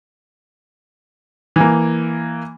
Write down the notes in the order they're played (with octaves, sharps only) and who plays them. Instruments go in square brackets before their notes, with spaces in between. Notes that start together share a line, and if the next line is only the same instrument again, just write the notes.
[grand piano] E3 A#3